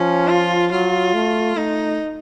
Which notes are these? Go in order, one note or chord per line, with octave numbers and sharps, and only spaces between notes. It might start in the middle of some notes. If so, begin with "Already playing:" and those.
Already playing: F3 C#4
F4
F#3 F4
A3
A3 D#4